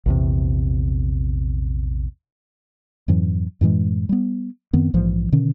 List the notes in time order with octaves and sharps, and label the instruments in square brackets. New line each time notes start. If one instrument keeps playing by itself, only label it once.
[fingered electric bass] A#1 E2 C3
[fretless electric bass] F2 G#2 E3 F#3
F#2 A2 E3 G#3
G3 B3
F#2 D#3 B3 C4
A#1 G#2 E3 F3
B2 D3 D#3 C#4